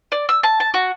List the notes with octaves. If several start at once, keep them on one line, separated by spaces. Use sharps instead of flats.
D5
E6
A5
A5
F#4